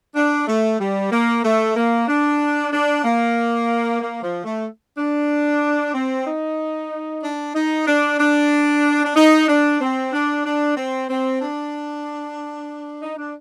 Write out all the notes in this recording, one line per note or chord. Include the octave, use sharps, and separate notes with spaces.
D4
A3
G3
A#3
A3
A#3
D4
D4
A#3
A#3
F3
A3
D4
C4
D#4
D4
D#4
D4
D4
D4
D#4
D4
C4
D4
D4
C4
C4
D4
D#4
D4